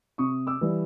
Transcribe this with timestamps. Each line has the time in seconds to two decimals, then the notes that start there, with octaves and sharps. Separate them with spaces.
0.18 C3 C#6 D#6
0.47 D6 E6
0.61 E3 G3